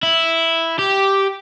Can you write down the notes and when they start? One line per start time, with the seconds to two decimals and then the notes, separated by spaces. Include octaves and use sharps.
0.03 E4
0.79 G4